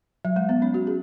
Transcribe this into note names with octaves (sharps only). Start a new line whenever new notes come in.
F#3
G#3
B3
C#4
F#4
G#4